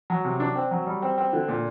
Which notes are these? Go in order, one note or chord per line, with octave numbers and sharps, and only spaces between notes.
F#3
C3
D4
C4
F#3
G3
C4
C4
D3
A#2